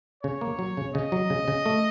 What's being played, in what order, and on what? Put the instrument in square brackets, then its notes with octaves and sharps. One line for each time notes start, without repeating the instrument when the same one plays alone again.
[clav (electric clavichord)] C#3 [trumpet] C#5
[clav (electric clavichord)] A#3
F#3
C#3
[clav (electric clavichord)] C#3 [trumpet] D#5
[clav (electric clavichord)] F#3
C#3
C#3
A3